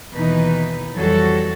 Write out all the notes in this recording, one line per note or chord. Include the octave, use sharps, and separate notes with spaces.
D#2 B2 E3 D#4 B4
F2 E3 F#3 G3 F#4 A4